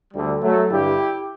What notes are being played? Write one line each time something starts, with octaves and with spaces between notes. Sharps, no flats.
D2 D3 G3
F#3 A3
G2 D3 E4 G4